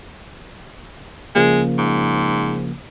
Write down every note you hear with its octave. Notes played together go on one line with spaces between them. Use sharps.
C#3 F3 G#3 A#3
G#2